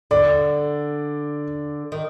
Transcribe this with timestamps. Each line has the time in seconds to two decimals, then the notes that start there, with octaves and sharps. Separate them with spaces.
0.11 D3 D5
1.92 D#3